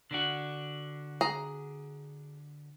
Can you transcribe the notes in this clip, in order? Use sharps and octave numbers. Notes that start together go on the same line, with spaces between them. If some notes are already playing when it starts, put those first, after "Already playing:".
D3 D4 F#4
G#4 A#5